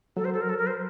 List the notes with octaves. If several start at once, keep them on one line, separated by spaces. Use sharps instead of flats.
F#3 A4
C5
A4
A#4
A4
A#4
C5